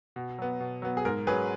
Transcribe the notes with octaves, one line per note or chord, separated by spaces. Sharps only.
B2
F#3 B3
B2
F#3 B3
G#4
G#2 A#4
F#3 C#4 G#4 B4